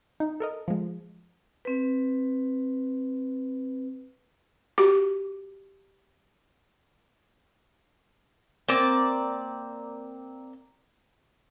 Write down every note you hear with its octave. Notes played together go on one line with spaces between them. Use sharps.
D#4
A4 A#4 D#5
F3 G#3
C4 B4
F#4 G4 D6
A#3 C4 D5